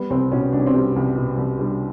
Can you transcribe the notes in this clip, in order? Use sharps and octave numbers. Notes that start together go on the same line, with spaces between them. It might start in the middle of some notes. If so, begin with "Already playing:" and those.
Already playing: G3 B3
C2 C4
B2 C#4
C2 D4
C#4
C4
G3 C#4
C2
B2
C2
G3 D4